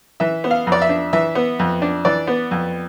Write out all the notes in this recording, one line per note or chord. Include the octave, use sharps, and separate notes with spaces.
E3 E5
B3
F5
F2
D5
E5
D4
E3 E5
B3
F2
D4
E3 D5
B3
F2